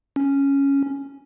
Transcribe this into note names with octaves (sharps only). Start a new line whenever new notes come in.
C#4